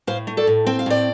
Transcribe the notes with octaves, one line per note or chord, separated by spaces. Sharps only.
A2 C5 F5
A3
A4 D5
A2
C4 G5
F5
A2 D5 G5